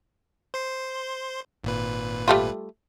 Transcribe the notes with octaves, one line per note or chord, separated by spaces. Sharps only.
C5 C6
G#1 A#2 B4
G3 A3 F4